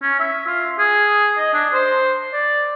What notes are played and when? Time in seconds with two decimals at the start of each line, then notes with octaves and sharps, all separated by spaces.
0.02 C#4
0.20 E5
0.47 F4
0.78 G#4
1.38 D#5
1.53 D4
1.73 C5
2.33 D5